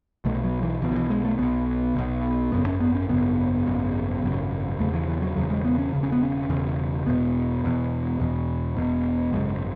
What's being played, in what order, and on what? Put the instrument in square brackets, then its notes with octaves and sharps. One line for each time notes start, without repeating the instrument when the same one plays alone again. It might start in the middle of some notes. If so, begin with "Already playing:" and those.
[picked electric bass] B1 B2 A3
F#3
E3
B1 B2 E3
D#3
E3
G#3
A3
B1 B2 B3
B1 B2
G#1 F#2 C#3 B3
C#4
B3
C#4
G#1 F#2 C#3 B3
G#1 F#2 C#3
G#1 F#2 C#3
E1 E2 C#3 A3
E3
E3
F#3
E1 E2 C#3 F#3
G#3
B3
C#4
E1 E2 C#3
C#4
B3
C#4
E1 E2 C#3
E1 E2 B2 B3
E1 E2 B2
E1 E2 B2
E1 E2 B2
G#1 F#2 C#3 G#3